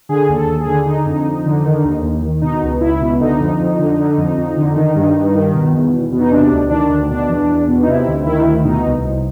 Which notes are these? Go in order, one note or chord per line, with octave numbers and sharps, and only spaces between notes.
D3 G#4
D#2
A4
D#2
G#4
D3
D3 D#4
F2
F2
D3
D#3
D#2
D#2
D#3
B2 D#4
C#2
C#2 E4
B2
D3 D#4
F2
F2
D3
D3
F2
F2
D3
D#3
G2
G2
D#3
B2
E2
E2
B2
D#4
C3 D4
D2
D#3 D4
D2
B2 D4
E2
E2
B2
D#4
C3 E4
D2
D#3 E4
D2
B2 D#4
C2
C2